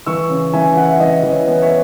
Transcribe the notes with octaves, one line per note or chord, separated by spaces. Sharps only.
E3 C#6 E6
C#3
E3 E5 G#5
E4 F#5
E5
E3 D#5
E3
C#5 E5
B3
C#5 E5